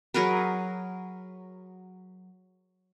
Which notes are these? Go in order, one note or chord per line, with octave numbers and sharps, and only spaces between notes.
F#3 G#4 A#4 B4